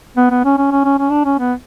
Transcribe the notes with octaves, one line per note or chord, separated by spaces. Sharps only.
B3
B3
C#4
C#4
C#4
C#4
C#4
D4
C#4
B3